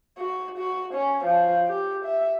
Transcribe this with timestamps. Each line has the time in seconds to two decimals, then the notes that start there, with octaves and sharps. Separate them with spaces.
0.18 F#4
0.57 F#4
0.93 C#4
1.25 F3
1.67 G4
2.05 E5